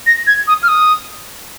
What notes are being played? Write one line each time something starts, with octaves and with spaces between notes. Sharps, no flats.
A#6
G#6
D#6
F6
D#6